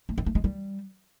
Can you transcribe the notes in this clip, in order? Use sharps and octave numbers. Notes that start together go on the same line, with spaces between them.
A3
C4
A3
G#3
G3